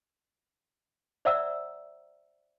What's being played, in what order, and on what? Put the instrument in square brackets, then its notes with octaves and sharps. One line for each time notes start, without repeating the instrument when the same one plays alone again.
[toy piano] C5 D5 E5 F#5 A#5 E6